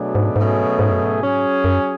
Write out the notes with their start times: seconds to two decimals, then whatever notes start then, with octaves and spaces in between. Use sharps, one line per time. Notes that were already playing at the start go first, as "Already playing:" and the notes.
Already playing: B2 F#3 A3 D4 G#4
0.15 G#2
0.36 G#2 B2 F#3 A3 C#4 G#4
0.79 G#2
0.91 F#2
1.02 G#2
1.22 F#3 C#4 G#4
1.64 F#2